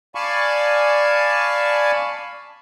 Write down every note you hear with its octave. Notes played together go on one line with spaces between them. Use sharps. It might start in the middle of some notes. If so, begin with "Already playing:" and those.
D5 F5 G#5 A5 B5 C#6